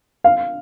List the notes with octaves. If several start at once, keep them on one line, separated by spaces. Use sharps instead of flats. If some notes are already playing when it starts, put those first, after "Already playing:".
F5